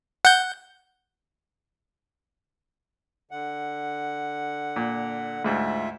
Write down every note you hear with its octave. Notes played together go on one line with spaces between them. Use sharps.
F#5 G6
D3 F#5
A#2
D2 G#2 F4 E5